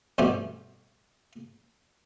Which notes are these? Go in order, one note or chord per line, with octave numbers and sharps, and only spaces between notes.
A1 G2 B2 A3 C4 G4